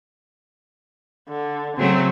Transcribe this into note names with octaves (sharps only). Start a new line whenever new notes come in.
D3
C#3 F#3 A3 C4